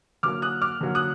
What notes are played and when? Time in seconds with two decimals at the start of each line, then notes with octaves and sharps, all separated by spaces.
0.23 D3 F#3 A#3 D6 F6
0.42 D#6 F#6
0.62 D6 F6
0.81 D3 F#3 A#3
0.95 D#6 F#6